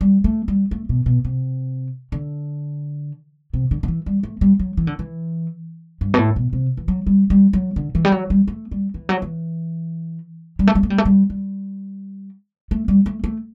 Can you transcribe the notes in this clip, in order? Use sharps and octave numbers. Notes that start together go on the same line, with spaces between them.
G3
A3
G3
A3
B2
B2
C3
D3
C3
D3
D3
E3
G3
A3
G3
F#3
E3
D3
E3
G2
B2
A2
B2
C3
E3
F#3
G3
G3
F#3
D3
E3
G3
F#3
G3
A3
G3
E3
F#3
E3
G3
A3
G3
A3
G3
A3
G3
G3
A3
G3
A3
A3